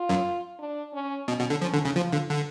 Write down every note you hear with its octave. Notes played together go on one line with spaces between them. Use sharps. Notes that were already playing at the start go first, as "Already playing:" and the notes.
Already playing: F4
F#2
D4
C#4
B2 C#4
B2
D3
F3 C#4
D3
C#3
F3 F4
D3
D3